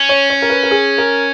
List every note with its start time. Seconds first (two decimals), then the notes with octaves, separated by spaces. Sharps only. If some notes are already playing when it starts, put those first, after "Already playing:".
Already playing: C#4
0.09 C#5
0.30 C#5
0.42 A#4
0.50 B4
0.63 A#4
0.71 G#4
0.98 A#4